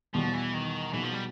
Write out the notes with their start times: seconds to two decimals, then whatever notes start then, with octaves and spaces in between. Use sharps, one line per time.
0.14 E2 B2 F3 G3 B3
0.34 E3
0.54 D#3
0.93 B2 E3 F#3 A#3 D#4 G#4
1.03 F3
1.14 G3